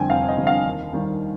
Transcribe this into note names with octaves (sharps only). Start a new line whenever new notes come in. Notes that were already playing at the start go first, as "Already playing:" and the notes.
Already playing: F2 D3 G3 G5 G#5
F1 F5
D#5
F2 D3 G3
F5
D#2
D#3 G3